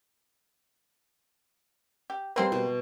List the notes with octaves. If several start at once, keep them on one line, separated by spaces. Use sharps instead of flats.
G4
G3 A#3 C4 B4 C5
B2